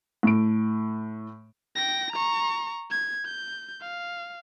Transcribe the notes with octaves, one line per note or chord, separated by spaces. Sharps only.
A2 D7
G5 A#6
A#5 C#6
G#6
G6
F5